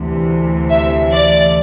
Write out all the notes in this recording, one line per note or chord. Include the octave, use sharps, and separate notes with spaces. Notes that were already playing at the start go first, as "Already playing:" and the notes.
Already playing: D2 C3 E3
E5
D5